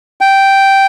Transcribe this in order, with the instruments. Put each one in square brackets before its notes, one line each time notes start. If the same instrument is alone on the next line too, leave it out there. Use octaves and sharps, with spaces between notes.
[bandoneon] G5